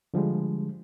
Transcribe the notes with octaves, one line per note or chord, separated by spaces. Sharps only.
D3 F3 G3 G#3